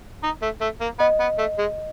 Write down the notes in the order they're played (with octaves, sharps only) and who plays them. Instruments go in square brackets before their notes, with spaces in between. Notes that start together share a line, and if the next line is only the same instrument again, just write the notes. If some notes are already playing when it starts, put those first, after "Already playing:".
[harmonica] D#4
A3
A3
A#3
[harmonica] B3 [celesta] D#5
[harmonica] B3
A3
G#3